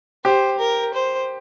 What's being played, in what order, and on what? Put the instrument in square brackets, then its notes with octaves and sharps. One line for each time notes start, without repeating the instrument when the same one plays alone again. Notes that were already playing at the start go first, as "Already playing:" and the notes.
[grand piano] G4 [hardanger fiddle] C5
[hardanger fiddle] A#4
C5